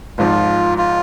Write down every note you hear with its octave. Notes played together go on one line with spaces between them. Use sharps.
G#1 G#2 F3 F4
F4